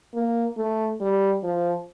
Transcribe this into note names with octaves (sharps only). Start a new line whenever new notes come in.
A#3
A3
G3
F3